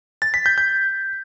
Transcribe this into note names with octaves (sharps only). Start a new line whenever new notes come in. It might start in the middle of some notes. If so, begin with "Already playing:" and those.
A6
B6
G6
G6